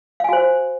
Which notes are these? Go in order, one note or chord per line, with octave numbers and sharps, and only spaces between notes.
F#4 C5 F5 G#5